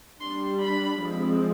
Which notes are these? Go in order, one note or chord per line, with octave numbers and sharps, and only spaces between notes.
G3 D4 C6
B5
F3 G#3 C4